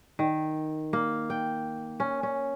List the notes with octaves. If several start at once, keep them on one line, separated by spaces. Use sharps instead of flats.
D#3
A#3
G5
C#4
C#4